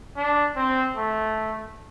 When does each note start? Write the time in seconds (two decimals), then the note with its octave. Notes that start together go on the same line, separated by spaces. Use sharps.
0.16 D4
0.56 C4
0.97 A3